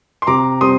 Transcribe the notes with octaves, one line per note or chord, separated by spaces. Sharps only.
C6
C3 A#5 D6
G3 C4 C6 D#6